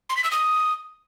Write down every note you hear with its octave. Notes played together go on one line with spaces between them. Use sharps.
C6
B6
E6
D#6